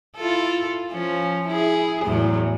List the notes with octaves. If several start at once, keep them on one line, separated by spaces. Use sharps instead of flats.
E4 F4 A4
F3 C#4
E4 G#4
E2 A2 F#3